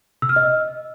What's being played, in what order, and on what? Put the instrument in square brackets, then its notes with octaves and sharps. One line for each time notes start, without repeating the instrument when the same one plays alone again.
[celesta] E6
F6
D#5